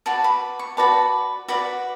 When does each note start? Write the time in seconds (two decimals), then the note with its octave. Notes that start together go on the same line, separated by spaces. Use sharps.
0.06 F#4 B4 D5 A5
0.24 B5
0.59 C#6
0.77 F#4 B4 D5 A5
1.48 F#4 B4 D5 B5